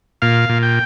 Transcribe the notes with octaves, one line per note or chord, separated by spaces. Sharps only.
A#2 F5
A#2
G5